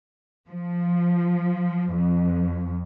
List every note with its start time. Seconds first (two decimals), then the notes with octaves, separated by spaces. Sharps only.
0.49 F3
1.95 F2